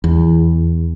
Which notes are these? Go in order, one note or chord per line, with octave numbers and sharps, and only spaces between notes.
E2